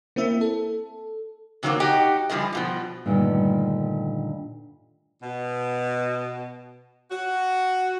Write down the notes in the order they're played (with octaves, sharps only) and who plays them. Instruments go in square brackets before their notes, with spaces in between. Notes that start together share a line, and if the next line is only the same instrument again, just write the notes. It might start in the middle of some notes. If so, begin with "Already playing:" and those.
[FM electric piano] A#3 C4 E4 E5
A4
[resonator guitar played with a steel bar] C3 D#3 F#3 A3 A#3 C4
D#4 F#4 G4 D#5
E3 F3 G3 F4 G#4 D#5
G2 B2 F3
[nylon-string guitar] G2 A#2 D3 D#3 G3 A3
[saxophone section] B2
F#4